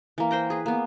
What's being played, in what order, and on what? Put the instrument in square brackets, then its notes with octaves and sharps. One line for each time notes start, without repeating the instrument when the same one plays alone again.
[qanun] E3 A#3
A#4 C5 G5 A#5
G#4 B4
A#3 B3